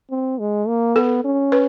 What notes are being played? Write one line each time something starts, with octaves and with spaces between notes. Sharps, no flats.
C4
G#3
A#3
B3 A4
C#4
B4